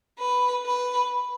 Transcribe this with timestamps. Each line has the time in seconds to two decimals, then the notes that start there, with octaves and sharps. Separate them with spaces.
0.19 B4
0.66 B4